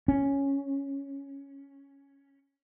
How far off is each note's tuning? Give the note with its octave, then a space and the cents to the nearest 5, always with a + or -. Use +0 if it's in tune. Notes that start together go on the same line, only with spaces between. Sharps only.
C#4 +0